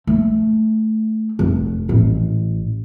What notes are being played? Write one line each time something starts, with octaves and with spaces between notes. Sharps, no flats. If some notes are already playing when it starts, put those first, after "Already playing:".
A3
F1
A1